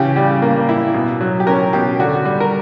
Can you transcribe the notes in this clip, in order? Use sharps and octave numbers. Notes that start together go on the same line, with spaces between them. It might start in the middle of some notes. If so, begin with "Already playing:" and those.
Already playing: C#3 E3 G4
G3 G4
A#3
E4
B2
F#3
G4
C#4 A#4
B2 G4
D3 F#4
G3
A#4